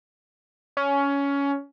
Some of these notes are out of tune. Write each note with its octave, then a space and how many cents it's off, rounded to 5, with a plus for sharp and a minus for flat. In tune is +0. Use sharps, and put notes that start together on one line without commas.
C#4 +15